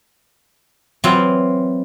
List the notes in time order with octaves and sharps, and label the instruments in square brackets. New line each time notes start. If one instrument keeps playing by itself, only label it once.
[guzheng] E3 F#3 C4 E4 F4